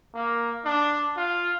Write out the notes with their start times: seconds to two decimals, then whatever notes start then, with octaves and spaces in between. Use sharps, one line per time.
0.15 A#3
0.65 D4
1.17 F4